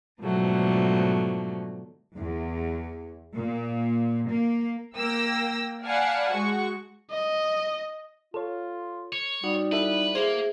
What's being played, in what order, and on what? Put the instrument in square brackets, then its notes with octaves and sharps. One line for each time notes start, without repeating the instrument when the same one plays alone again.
[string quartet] G#2 B2 D3 F3 F#3 A3
[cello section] E2
A#2
A#3
[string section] A#3 G5 E6 A#6
D5 F5 F#5 G#5 A5 B5
G#3 F#4 C#6
[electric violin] D#5
[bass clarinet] F4 [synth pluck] A4 C#5
[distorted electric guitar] C#5
[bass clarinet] G3 [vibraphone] D#4 [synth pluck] F#4
[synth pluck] E4 A4 E5 [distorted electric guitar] B4
[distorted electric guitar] A#3 [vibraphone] G#4 E5 [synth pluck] C5